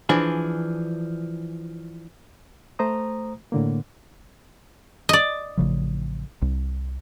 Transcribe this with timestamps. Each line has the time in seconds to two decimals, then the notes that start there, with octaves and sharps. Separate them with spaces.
0.09 E3 F3 D4 G#4
2.79 A3 C5 A#5 D#6
3.52 A2 D3 A#3
5.09 D5 D#5
5.57 A1 C#3 F3
6.42 C2